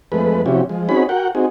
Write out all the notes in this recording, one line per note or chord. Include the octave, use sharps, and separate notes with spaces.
F2 G#3 A3 B4
C3 F3 C#4 E4 F#4 G4
F3 G#3
C4 C#4 D#4 F#4 G#4 B5
F#4 A#4 F#5 G5
C4 D#4 F#4 G#4